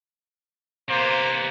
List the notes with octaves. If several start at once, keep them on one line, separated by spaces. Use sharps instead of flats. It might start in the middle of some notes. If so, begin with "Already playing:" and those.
C3 A#3 B3 C5